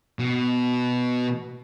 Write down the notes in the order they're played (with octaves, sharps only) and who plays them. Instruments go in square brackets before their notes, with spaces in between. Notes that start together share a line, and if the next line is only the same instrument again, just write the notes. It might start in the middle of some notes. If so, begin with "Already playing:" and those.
[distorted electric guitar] B2